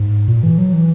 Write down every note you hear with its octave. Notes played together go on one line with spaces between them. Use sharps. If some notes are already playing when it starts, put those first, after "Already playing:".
Already playing: G#2
A#2
E3
F#3
E3